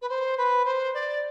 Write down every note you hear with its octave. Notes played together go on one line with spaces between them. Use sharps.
B4
C5
B4
C5
D5